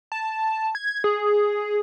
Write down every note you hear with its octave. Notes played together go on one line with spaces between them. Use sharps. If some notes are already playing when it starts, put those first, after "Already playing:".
A5
G#6
G#4